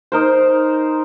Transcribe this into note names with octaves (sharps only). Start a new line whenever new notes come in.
D#4 A#4 C5